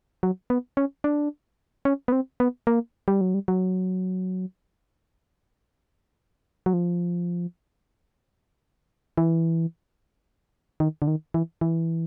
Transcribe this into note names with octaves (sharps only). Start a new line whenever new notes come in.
F#3
B3
C#4
D4
C#4
B3
C4
B3
A#3
G3
F#3
G3
F#3
F#3
F3
E3
D#3
D3
D#3
E3
E3